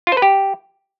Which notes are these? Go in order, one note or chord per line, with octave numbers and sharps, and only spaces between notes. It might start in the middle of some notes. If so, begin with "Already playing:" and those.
F4
C5
B4
G4